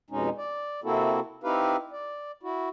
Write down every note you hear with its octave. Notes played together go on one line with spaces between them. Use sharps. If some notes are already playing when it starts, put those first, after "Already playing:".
F2 B2 G#3 C#4 D#4
D5
C3 A#3 C4 E4 F#4 A4
C4 D#4 E4 G4 B4 F5
D5
E4 F#4